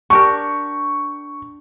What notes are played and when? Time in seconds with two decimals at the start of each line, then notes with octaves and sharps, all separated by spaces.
0.10 D4 G4 A#4 C#6